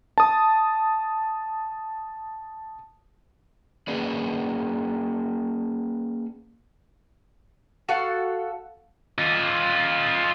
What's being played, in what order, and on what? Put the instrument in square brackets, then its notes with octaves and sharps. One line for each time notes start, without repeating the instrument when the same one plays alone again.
[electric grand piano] A5 D#6
[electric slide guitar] A#3 C#4 G#4 B4 D5
[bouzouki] F#4 A4 F5
[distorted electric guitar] F4 D#5